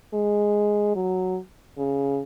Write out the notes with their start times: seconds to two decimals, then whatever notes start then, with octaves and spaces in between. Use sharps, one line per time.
0.13 G#3
0.95 F#3
1.78 C#3